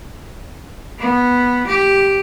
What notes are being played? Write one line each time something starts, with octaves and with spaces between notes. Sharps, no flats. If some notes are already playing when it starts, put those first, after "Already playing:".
B3
G4